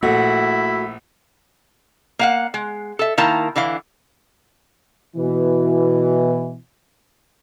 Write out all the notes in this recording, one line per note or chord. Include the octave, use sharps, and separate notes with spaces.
A#1 A3 E4 F#4
A#3 F5 F#5
G#3
A4 E5
D#3 A#3 E4 F5 A5 A#5
D3 E3 E4 F5
B2 E3